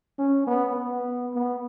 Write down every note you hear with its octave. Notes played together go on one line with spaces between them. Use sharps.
C#4
B3
B3
B3